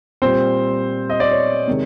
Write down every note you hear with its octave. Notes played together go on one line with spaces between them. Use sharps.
A#2 G3 C4 C5
D#5
D5
C#5
C3 D#3 G#3